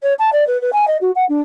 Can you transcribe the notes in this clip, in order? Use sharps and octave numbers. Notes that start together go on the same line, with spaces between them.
C#5
A5
D5
B4
B4
G#5
D#5
F#4
F#5
D4